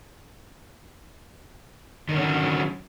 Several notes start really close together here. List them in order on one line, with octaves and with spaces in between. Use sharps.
D#3 D3 C#4 F#4 F#3